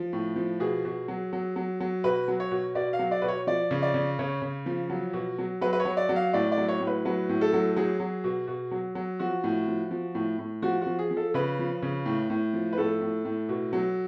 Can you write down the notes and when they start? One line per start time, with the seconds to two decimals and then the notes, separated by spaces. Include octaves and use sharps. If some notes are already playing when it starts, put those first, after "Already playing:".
Already playing: F3
0.13 A2
0.36 F3
0.60 B2 G#4
0.85 B2
1.08 F#3
1.33 F#3
1.56 F#3
1.80 F#3
2.04 B2 B4
2.28 F#3
2.40 C#5
2.51 B2
2.75 B2 D5
2.93 F5
2.99 F#3
3.11 D5
3.22 B2 B4
3.28 C#5
3.47 F3 D5
3.71 C#3
3.82 D5
3.94 C#3
4.19 C#3 C#5
4.42 C#3
4.66 F3
4.90 F#3
5.13 B2
5.38 F#3
5.61 F#3 B4
5.73 B4
5.80 C#5
5.85 F#3
5.97 D5
6.09 F#3
6.16 F5
6.33 A2 D5
6.52 D5
6.58 F#3
6.69 C#5
6.81 A2
6.87 B4
7.05 F#3 B4
7.29 A2
7.41 A4
7.53 F#3
7.76 F#3 G#4
8.00 F#3
8.24 B2
8.48 B2
8.71 F#3
8.95 F#3
9.20 F3 F#4
9.44 A2
9.67 F3
9.91 F3
10.15 A2
10.39 A2
10.62 F3 F#4
10.81 F3 F#4
10.99 G#4
11.11 F3
11.17 A4
11.34 C#3 B4
11.59 F3
11.82 C#3
12.06 A2
12.30 A2
12.53 F3
12.73 B4
12.78 A2 A4
13.01 A2
13.25 A2
13.49 B2
13.73 F#3